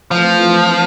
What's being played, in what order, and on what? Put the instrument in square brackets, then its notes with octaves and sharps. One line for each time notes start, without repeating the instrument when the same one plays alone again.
[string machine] E3 A3 C4 F4 B4 [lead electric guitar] F3